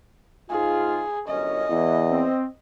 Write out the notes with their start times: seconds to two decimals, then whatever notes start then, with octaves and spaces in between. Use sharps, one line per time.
0.50 G#2 F4 G#4
1.28 G1 F#2 C#4 D#5
1.70 E2 E3
2.11 C4